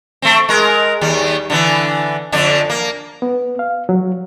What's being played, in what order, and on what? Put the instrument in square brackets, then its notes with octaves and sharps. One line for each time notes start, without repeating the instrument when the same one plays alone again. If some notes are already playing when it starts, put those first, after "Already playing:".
[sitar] A3 C4
G#3 A#4
D#2 G3
D3 E3 B3
F2 D3 D4
A#3
[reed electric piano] B3
F5
F#3